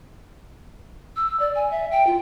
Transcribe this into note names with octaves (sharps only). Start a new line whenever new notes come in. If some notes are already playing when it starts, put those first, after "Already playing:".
E6
D5
G#5
E5
G5
F4